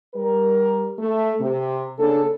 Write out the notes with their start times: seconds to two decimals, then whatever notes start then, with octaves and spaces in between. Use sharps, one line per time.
0.14 G3 A#4
0.98 A3
1.38 C3
1.98 C#3 A#3 D4 A4